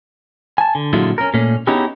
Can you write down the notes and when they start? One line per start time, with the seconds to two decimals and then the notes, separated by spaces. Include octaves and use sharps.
0.58 G#5 A5
0.75 D3
0.93 A#2 D3 F#3 G#3 E4 F4
1.18 C#4 A#4
1.34 A#2 A3 C#4
1.67 B3 C#4 D#4 E4 G4 G#4